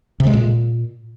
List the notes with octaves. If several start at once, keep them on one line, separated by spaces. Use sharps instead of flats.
C3
G#3
A#2